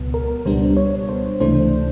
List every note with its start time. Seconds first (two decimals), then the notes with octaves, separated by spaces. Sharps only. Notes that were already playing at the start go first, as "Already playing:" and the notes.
Already playing: C#2 B2 F#3 B3
0.14 A#4
0.45 C#2 B2 G3 B3 D4 C5
0.77 C#5
1.09 C5
1.40 C#2 C3 E3 A3 D4 C5